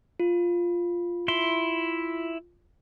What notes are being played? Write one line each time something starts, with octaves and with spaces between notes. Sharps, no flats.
F4
E4 C6